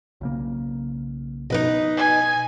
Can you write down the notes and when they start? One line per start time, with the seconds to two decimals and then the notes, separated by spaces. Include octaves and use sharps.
0.21 B1 C#3 A#3
1.50 B2 D#4 B4 D#5
1.97 G#5